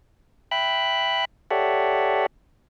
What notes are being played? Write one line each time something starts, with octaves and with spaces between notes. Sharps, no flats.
E5 G5 B5 F#6
G4 A4 C#5 D5 E5 F#5